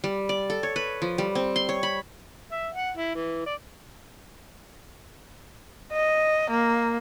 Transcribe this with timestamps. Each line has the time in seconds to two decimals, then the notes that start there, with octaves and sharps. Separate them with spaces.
0.04 G3
0.29 D5
0.50 A4
0.63 C#5
0.76 B4
1.02 F3
1.18 G3
1.35 C4
1.56 C6
1.69 C#5
1.83 B5
2.52 E5
2.74 F#5
2.97 E4
3.15 E3
3.46 D5
5.93 D#5
6.51 A#3